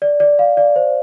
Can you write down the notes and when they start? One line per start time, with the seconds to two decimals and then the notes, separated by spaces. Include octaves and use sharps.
0.02 D5
0.20 D5
0.39 F5
0.57 D5
0.76 C5